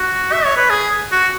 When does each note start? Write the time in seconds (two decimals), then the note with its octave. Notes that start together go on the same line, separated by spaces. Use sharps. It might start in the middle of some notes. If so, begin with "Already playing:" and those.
Already playing: F#4
0.33 E5
0.45 C#5
0.57 B4
0.70 G#4
1.12 F#4